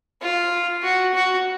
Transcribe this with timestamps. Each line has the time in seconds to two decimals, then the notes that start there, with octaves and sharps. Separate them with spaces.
0.22 F4
0.83 F#4
1.14 F#4